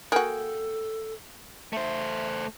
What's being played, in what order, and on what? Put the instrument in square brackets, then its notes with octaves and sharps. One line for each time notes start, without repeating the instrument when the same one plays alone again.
[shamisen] A#3 F#4 [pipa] G#4 G5 [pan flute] A4
[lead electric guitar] A3 C5 [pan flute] E5